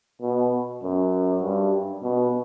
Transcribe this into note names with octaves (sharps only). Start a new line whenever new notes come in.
B2
F#2
G2
B2